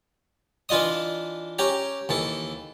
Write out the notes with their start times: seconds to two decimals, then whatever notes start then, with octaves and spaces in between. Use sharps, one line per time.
0.69 E3 D4 F4 D#5 D#6
1.59 C#4 G4 A#5
2.09 D#2 E3 A4